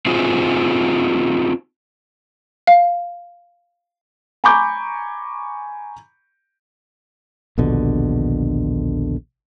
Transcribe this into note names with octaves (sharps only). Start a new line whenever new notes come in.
C4 D#4 F4 F#4 G#4
F5
G#5 A#5 B5 C#6 D6 G6
A#1 D#2 B2 D3